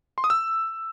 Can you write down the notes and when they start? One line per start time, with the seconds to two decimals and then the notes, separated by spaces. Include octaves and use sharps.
0.18 C6
0.24 D#6
0.30 E6